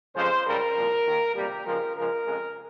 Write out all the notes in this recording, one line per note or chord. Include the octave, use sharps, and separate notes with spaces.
F2 C#3 F3 G#3 C5
C#2 C#3 G3 A#4
C2 A#2 F3
D#2 D#3 A#3
C#2 C3 G3 A#3 G4
C#2 C#3 F3 G#3 A#4
C#2 C#3 F3 G#3 A#4
F2 C#3 G#3